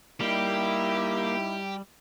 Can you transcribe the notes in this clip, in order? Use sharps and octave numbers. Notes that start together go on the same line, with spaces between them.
G3 A#3 D#4 E4 G4